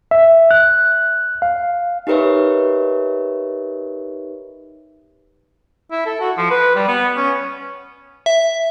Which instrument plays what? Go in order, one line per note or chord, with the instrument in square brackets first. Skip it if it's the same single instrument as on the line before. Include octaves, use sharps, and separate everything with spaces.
[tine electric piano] E5
F#6
F5
[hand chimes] D#4 G4 A#4 B4 C#5 E5
[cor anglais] E4
A4
F#4
F3
B4
G3
B3
C#4
[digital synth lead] E5